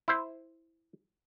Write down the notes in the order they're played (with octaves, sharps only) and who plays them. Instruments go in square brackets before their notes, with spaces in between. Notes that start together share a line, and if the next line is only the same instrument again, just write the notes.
[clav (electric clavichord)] E4 C5